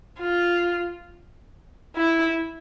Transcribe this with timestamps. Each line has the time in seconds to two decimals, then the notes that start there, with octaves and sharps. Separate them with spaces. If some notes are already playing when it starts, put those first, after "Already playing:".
0.20 F4
1.96 E4